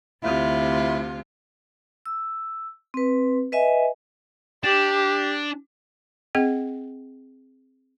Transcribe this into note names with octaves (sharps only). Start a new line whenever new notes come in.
D2 C3 E4 F4
E6
C4 B4
B4 D#5 E5 G#5
D4 G4
C4 G#4 D#5 G5